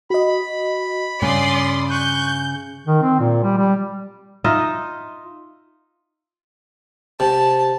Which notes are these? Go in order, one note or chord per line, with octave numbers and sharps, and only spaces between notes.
F#4 D#5 B5
G2 C#3 D5 C6 D#6
C#6 F#6 G6
D#3
C4
A#2
G3
G3
D#4 F4 D#5 E5
C3 A5